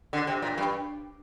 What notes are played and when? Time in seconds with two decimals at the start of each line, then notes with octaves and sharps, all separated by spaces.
0.13 D3
0.27 C3
0.42 A#2
0.58 G2